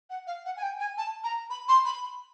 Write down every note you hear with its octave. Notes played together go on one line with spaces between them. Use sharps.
F#5
F5
F#5
G#5
G5
G#5
A5
A#5
B5
C6
B5